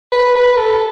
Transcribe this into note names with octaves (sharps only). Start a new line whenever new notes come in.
B4
B4
A4